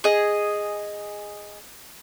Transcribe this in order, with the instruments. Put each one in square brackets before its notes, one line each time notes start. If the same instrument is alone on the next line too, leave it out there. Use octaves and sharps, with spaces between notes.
[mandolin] G#4 D#5